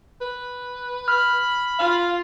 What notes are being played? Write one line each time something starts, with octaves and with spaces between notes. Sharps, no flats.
B4
B5 F6
F4 F5